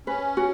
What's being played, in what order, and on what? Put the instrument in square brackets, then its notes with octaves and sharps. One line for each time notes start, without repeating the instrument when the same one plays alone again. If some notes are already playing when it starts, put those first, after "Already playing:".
[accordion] C#4 [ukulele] B4
[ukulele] F#4